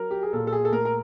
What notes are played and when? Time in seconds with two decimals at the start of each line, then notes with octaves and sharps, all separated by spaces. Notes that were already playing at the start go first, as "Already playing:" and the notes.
Already playing: F#3 A#4
0.11 G4
0.23 G#4
0.33 A#2 A4
0.47 A4
0.53 G#4
0.65 A4
0.72 A3 A#4
0.85 A#4